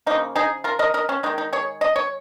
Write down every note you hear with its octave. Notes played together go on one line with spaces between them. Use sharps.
C#3 F3 A#3 D#4
D#4 G#4
F4 A#4
A#4 D#5
A#4 D#5
C#4
D#3 G#3 D#4
D#4
G#4 C#5
D#5
C#5